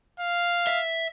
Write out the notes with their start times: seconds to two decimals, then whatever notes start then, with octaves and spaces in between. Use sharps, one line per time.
0.20 F5
0.67 E5